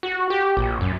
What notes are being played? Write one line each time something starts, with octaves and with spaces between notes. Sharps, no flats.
F#4
G4
A#1
F#2